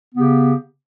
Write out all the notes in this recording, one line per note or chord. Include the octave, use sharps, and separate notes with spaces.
C#3 B3 G4